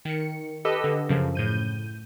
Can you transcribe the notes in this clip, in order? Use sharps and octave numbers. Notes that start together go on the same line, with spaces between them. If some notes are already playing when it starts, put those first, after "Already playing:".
D#3 C#7
G4 A4 B4 D#5 E6
D3
F#2 C#3 F3
A2 G6 D#7